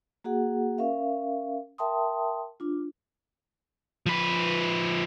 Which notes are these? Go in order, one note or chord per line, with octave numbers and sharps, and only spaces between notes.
A#3 F#4 G#4 F#5
C#4 A#4 E5 F5
A#4 E5 G5 A5 C6 D#6
D4 F4
F3 B4